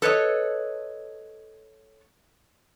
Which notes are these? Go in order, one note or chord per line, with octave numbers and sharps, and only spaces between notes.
A4 B4 C#5 D#5